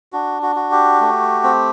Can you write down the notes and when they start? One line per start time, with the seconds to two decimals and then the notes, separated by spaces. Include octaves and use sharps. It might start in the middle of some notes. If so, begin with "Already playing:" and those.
0.13 D4 F#4
0.43 F#4
0.56 F#4
0.72 G4
1.01 A3
1.44 C4